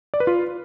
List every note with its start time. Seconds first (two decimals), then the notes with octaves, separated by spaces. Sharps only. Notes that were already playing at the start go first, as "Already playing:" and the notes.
0.14 D5
0.20 B4
0.27 F4